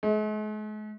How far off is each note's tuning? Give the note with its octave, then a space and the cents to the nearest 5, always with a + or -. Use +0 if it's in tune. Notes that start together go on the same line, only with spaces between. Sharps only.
G#3 +45